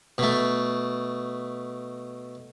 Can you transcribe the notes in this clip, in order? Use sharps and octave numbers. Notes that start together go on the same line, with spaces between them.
B2 A3